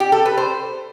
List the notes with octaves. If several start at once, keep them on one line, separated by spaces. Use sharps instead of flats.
G4
A4
B4
C5